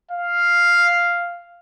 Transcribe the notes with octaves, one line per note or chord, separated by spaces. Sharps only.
F5